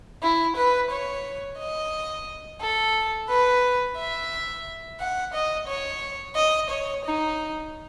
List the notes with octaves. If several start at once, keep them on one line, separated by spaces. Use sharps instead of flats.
E4
B4
C#5
D#5
A4
B4
E5
F#5
D#5
C#5
D#5
C#5
D#4